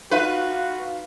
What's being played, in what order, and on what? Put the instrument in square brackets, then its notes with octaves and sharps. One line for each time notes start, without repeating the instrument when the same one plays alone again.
[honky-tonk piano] D#4 F4 F5 [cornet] F#4 [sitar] B4